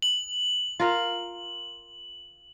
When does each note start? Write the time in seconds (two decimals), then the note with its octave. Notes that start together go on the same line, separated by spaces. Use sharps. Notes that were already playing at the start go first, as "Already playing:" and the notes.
0.02 F#7
0.80 F4 A#4 F5